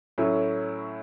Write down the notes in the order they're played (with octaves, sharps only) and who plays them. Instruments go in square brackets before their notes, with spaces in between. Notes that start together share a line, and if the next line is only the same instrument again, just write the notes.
[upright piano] A2 F#3 A3 C#4 E4